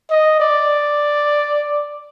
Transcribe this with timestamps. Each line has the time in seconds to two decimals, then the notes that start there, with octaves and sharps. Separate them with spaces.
0.10 D#5
0.40 D5